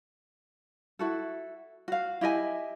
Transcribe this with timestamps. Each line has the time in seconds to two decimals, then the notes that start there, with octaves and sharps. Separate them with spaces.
0.99 E4 F#4 A4
1.88 F#4 F5
2.21 E4 G4 D#5 G#5